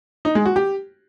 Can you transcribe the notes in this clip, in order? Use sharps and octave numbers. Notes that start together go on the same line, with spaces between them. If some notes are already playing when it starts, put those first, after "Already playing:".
D#4
G#3
F#4
G4